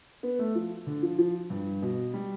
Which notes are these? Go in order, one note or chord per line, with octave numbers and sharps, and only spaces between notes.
B3
A3
F3
D3
F3
F3
G2
B2
G3